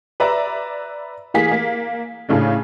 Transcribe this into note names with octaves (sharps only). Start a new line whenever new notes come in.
B4 D5 E5 A#5
E3 A#3 G#4 B6
A#3
A2 C#3 A3 D4